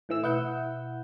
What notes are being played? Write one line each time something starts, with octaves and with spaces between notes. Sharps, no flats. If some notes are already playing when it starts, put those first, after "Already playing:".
A2 E3 E6
B2 E4 F#5 G6